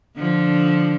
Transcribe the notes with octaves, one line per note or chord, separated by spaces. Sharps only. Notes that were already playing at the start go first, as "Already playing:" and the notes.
D3 F3